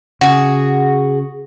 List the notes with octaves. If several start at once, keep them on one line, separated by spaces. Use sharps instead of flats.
C#3 F#4 G#4